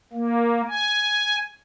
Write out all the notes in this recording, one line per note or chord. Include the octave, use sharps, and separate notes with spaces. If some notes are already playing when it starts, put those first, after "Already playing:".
A#3
G#5